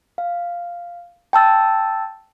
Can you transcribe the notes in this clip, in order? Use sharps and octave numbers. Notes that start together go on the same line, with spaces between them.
F5
G5 A5 E6 A6